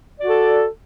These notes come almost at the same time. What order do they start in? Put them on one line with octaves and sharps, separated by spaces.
D5 F#4 A4